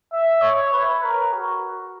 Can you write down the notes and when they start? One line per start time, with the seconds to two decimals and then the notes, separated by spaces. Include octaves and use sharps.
0.12 E5
0.42 C#5
0.73 B4
1.03 A#4
1.33 F#4